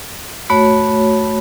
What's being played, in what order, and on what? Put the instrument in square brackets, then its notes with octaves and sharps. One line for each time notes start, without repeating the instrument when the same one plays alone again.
[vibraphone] A3 F#4 C#5 [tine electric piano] B5